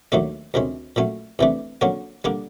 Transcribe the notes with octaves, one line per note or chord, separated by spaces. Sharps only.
D#2 D#3 F#3 A3 D4
D2 C3 D#3 G#3 C#4
A#2 F#3 A3 C#4
E2 C3 E3 A3 D4
D3 F#3 A#3 C#4 F#4
D3 G3 A#3 D4